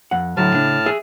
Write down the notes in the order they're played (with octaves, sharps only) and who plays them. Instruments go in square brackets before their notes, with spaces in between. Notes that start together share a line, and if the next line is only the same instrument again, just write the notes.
[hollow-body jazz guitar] F2 F#5
[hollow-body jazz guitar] D2 F#3 [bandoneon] A2 A5 F6
[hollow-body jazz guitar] C#3 D4
G#4 E5